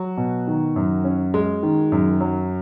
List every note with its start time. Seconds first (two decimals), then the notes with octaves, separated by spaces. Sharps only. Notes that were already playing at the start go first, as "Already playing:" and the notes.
Already playing: F#3 F#4
0.17 B2
0.47 D#3
0.76 F#2
1.04 C#4
1.34 G#3
1.63 D#3
1.92 F#2
2.21 F#3